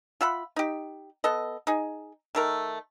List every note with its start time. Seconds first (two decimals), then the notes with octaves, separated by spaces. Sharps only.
0.21 F4 E5 F#5 B5
0.56 D#4 G4
1.24 B3 A4 D#5
1.67 D#4 G#4
2.35 D#3 A3 A#4